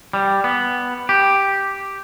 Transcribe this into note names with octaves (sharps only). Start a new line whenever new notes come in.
G3
B3
G4